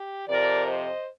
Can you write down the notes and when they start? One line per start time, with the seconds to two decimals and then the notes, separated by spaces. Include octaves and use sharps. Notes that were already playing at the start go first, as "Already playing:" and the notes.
Already playing: G4
0.27 F2 C3 F3 A#4 D5
0.66 C5 D#5